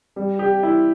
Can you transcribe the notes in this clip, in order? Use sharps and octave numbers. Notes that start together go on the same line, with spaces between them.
G3
G4
E4